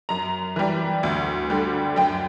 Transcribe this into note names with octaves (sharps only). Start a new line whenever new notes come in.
F#2 A#5
E3 G3
D2
D3 G3
F#2 G5